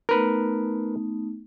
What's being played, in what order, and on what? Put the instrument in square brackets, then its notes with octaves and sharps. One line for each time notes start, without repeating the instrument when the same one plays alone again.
[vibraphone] A3 B3 D#4 [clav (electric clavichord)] A#4 B4